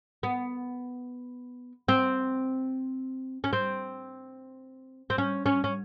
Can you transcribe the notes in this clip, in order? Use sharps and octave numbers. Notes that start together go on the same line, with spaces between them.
B3
C4
C#4
C4
C4
C#4
C#4
C#4